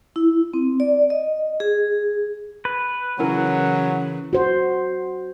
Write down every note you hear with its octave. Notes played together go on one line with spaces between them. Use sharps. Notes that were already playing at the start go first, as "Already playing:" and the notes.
E4
C4
D5
D#5
G#4
B4
C#3 E3 F#3 C#4 E4 A#4
F#4 C5